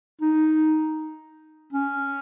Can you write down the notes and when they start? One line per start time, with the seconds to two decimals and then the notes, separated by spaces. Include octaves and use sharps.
0.22 D#4
1.73 C#4